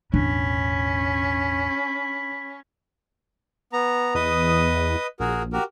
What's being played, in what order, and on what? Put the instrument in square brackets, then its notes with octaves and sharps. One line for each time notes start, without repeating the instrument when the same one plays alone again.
[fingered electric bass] E1 A1 [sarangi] C#4 [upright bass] D4 [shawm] B5
[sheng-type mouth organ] B3 A#5
[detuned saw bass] E2 [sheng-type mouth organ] B4 D#5 D#6
[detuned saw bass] A#1 [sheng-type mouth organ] F#4 G#4 A#4
[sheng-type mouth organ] F#4 G4 A#4